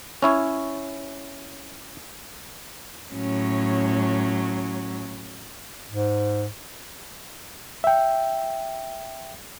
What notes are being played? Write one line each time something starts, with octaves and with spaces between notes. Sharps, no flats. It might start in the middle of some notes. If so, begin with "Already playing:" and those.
C#4 E4 C#5
A2 F#3 C#4
G#2
E5 G5